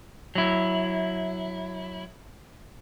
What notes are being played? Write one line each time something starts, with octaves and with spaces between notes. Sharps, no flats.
F#3 E4